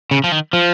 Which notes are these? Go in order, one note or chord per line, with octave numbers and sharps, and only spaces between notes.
C#3
F3
D#3
F3